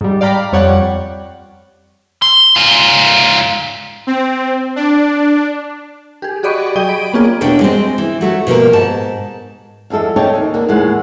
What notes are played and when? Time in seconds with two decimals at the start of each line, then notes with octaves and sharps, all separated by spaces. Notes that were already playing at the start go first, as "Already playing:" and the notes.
0.01 G#2 G3
0.21 D5 F5 G5 A#5 B5
0.52 F2 G3 C#5 D5 F#5 G5
2.22 C6
2.56 G#2 F4
4.07 C4
4.76 D4
6.22 G4 G#4
6.43 F#4 G4 D5 D#5 B5 C#6
6.76 F#3 G#4 D#5 G5 D#7 G7
6.89 B5 D7
7.14 A#3 B3 C#4 F4 G#4 D5
7.41 E2 B2 C#4 D4 G5
7.61 G#3 C4
7.98 E3
8.21 F#3 A3 F#4
8.47 B2 F3 A3 A#3
8.73 G#2 A5
9.90 E2 F3 G#3 A4 E5
10.16 D#4 A4 C#5 D5 G5 A5
10.35 D#2
10.54 D3 A#3
10.68 D#2 A2 E3 G#3 F#5